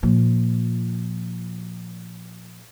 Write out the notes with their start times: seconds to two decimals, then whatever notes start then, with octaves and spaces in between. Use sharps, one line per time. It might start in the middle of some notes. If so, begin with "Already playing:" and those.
0.03 A#2 F3